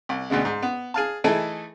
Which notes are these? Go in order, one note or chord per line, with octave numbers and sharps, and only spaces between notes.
C2
D2 B2 D3 G#3
G#2
B3
G#4 F5 A5
E3 A3 D#4 E4 G#4 A4